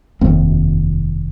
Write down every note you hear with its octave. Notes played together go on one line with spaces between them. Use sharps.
F1 D#2 A#3 C4